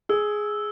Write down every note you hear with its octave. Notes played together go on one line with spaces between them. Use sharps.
G#4 E6